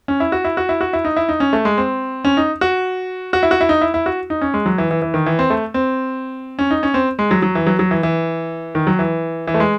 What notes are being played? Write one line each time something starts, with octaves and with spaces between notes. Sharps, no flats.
C#4
E4
F#4
E4
F#4
E4
F#4
E4
D#4
E4
D#4
C#4
A3
G#3
C4
C#4
D#4
F#4
F#4
E4
F#4
E4
D#4
E4
E4
F#4
D#4
C#4
G#3
F#3
E3
E3
E3
D#3
E3
C4
A3
C4
C#4
D#4
C#4
C4
G#3
F#3
F#3
E3
F#3
F#3
E3
E3
D#3
F#3
E3
E3
A3
G#3